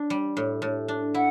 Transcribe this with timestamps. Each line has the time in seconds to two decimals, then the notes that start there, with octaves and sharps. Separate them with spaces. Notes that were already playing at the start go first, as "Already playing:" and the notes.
Already playing: D4
0.10 G3
0.37 A2
0.62 A2
0.88 D4
1.14 E4 F#5